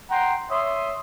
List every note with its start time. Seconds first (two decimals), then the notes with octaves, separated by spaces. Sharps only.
0.11 F#5 G5 A#5 C6
0.51 C#5 E5 C6 D#6